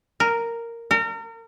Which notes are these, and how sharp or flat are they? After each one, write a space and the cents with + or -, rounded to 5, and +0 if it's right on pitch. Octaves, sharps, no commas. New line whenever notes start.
A#4 -5
A#4 -35